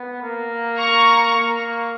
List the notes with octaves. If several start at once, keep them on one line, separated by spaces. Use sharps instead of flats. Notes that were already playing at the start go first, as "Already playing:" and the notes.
Already playing: B3
A#3
A#5 C#6
A#3